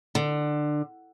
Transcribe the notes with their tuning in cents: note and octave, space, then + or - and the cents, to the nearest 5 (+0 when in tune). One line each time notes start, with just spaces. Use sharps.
D3 +20